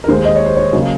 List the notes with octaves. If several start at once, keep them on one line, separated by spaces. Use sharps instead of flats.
A#4
D#2 D#3 G#3 C5
D#5
C#5
C5
C#5
C#3 F#3 A#3 D#5